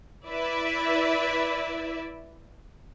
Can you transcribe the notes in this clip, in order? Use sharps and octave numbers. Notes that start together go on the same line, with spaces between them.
E4 B4 D5 E5